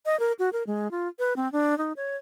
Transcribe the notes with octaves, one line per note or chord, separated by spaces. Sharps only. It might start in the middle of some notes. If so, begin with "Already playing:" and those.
D#5
A#4
F#4
A#4
G#3
F4
B4
C4
D4
D#4
C#5